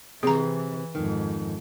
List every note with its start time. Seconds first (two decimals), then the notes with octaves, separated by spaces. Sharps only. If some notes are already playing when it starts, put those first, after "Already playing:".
0.23 C3 E3 C4 G#4 A#5
0.95 F2 G#2 D#3